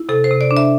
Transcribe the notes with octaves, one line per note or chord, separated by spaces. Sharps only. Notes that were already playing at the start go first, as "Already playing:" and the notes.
Already playing: E4
C3 A4
C5
C3
D5
D4
E5